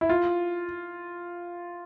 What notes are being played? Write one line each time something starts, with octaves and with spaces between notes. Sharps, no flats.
E4
F4